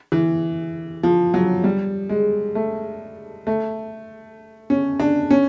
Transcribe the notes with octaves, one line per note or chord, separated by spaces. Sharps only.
E3
F3
F#3
G3
G#3
A3
A3
C#4
D4
C#4